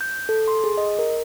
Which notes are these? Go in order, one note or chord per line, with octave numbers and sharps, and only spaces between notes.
G6
A4
C6
G#4
D#5
A#4